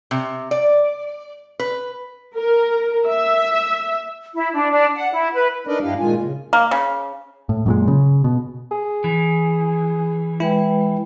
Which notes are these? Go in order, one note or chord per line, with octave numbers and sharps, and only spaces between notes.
C3
D5
B4
A#4
E5
E4
D4
D4
F#5
E4
B4
D4 D#4 A#4 B4 D5 D#5
G2 D4 E4 G4 F5
A#2 D#3 G#3 F4 G#5
C#3
A#3
C#3
A2
F#2 A#2 G#3
C#3
B2
G#4
E3
G#3 E4 B4 G5